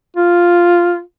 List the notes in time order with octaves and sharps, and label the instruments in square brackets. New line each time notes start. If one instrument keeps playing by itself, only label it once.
[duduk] F4